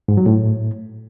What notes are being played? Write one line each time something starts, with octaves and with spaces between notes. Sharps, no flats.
G#2
F#3
A2